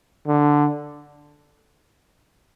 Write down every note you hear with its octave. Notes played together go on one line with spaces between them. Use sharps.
D3